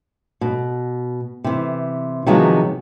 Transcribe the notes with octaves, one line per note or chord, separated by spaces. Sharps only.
B2
C3 E3
C3 D#3 F3 F#3 G#3 B3